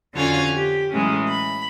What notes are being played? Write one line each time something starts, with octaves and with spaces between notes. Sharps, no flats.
F2 D3 C#4 F4 F#4 G#5
G4
A2 E3 F#3 G#3 C#4
B5